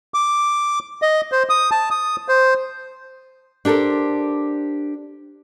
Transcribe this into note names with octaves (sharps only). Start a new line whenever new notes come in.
D6
D#5
C5
D#6
A5
D#6
C5
D4 G4 A4 A#4 C5